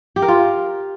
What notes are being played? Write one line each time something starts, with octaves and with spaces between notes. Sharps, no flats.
G4
A#4
F4